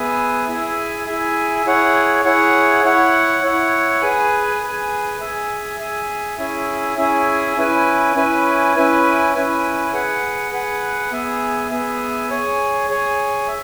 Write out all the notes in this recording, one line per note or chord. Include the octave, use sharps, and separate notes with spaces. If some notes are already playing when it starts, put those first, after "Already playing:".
Already playing: B3 G#4 B4 E5 G#5
E4 G#4 E5 G#5
E4 G#4 E5 G#5
E4 G#4 C#5 F#5
E4 G#4 C#5 F#5
E4 C#5 F#5
E4 C#5 F#5
G#4 B4 G#5
G#4 B4 G#5
G#4 E5 G#5
G#4 E5 G#5
C#4 E4 G#4 E5 G#5
C#4 E4 G#4 E5 G#5
C#4 E4 B4 G#5
C#4 E4 B4 G#5
C#4 E4 B4 G#5
C#4 E4 B4 G#5
G#4 B4 F#5
G#4 B4 F#5
B3 G#4 E5 G#5
B3 G#4 E5 G#5
G#4 C#5 G#5
G#4 C#5 G#5
E5